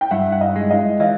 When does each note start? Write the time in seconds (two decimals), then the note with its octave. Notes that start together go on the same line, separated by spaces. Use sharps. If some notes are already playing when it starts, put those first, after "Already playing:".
0.01 G5
0.11 G2 E5 F#5
0.32 F#5
0.40 D#5 F5
0.56 G#3
0.70 D#5 F5
1.00 E3 D#5 F5